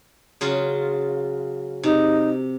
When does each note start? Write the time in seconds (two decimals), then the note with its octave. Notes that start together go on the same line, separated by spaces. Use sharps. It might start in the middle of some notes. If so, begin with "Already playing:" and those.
0.41 C#3 F#3 F4
1.83 C3 D#4